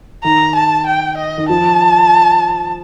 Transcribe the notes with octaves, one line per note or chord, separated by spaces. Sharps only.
D#3 A#5
A5
G5
D#5
D#3
F3 A5